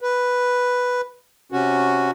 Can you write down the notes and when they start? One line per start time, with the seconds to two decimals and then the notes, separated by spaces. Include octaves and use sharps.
0.01 B4
1.52 C3 C#4 F#4